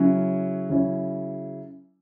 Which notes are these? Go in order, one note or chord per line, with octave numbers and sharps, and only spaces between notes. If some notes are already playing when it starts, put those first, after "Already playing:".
Already playing: C#3 F#3 C#4 E4
C#3 F#3 C#4 E4